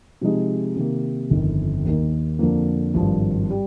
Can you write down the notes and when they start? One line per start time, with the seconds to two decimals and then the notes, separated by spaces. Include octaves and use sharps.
0.21 C3 F3 G#3 D#4
0.76 C3 D#3 A#3
1.30 G1 F2 D#3
1.85 D#2 D#3 A#3 D#4
2.39 F2 D3 F3 A#3
2.94 G#1 G2 F3
3.50 G3